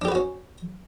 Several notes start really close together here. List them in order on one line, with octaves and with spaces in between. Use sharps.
D4 G4 B4 F#4 C#4